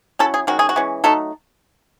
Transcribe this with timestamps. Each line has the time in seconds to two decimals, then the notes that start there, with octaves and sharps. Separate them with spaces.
0.19 F#3 C#4 E4 A4
0.34 G#4
0.47 D#3 G#3 C#4 F#4
0.59 G#4
0.69 F#4
0.76 E3 G#3 C#4
1.04 F#3 A3 D#4 A4